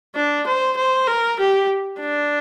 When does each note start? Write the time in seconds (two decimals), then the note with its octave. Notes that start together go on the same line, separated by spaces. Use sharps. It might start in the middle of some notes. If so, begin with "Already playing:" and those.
0.15 D4
0.46 C5
0.77 C5
1.07 A#4
1.39 G4
2.01 D4